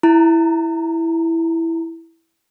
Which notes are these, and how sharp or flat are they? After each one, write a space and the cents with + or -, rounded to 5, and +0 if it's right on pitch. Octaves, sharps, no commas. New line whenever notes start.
E4 +0 A#5 -35